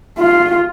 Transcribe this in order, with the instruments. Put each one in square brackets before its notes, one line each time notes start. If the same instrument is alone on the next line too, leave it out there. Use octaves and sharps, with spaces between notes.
[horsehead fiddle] F4